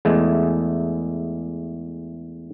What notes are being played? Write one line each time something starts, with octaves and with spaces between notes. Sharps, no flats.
E2 G#3 A3